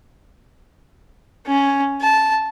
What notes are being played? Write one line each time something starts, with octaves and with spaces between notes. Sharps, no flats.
C#4
A5